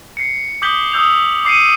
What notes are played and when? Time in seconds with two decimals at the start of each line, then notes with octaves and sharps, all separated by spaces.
0.17 C7 C#7
0.62 D6 D#6 G6 B6 F#7 G7
0.92 D#6 E6 G6 F7
1.45 D6 C7 C#7 D#7